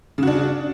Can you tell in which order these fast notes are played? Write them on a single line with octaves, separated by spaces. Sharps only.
C#3 F#4 D4